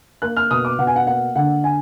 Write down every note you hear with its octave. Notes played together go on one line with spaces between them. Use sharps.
A#3 F#6
F6
B2 D#6
D6
B2 F#5
G#5
F#5
A#3 F#5
D3 F#5
G#5